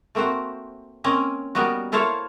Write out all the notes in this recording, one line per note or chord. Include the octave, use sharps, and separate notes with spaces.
A3 A#3 C4 F#4 C5
A#3 C4 C#4 D#5
G3 A#3 B3 D#4 F#4
A#3 E4 A4 C5 C#5 F5